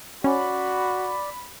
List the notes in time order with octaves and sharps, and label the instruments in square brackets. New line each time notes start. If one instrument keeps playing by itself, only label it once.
[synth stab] C#4 [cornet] F#4 [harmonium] D5 [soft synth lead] B5